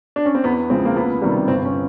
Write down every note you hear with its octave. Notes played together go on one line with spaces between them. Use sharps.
D4
C#4
C4
E2 B3
C#3 F3 G#3 C4
A#3
C#2 B3
C3 D#3 G3
G1 C4
C#4